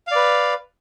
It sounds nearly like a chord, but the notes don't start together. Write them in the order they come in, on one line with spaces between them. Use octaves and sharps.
F5 D5 B4